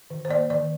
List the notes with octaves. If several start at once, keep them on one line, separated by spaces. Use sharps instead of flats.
D#3
C5
A#3 D5
D#3 D5